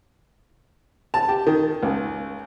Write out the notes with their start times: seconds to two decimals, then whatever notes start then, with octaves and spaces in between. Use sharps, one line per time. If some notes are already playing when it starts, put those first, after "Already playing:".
1.14 A5
1.28 G4
1.47 D#3
1.83 C#2